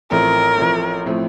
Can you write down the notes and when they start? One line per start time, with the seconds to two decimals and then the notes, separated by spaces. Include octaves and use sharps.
0.11 A1 A2 F3 A3 C4 A#4
0.57 A1 A2 F3 A3 C4
1.05 A2 F3 A3 C4